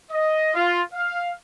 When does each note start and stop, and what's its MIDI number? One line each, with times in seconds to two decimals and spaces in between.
0.11 0.54 75
0.54 0.82 65
0.94 1.30 77